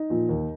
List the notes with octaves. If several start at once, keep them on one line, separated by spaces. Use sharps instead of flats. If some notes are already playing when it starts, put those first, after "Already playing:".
Already playing: D#4
A#2 F3
D#2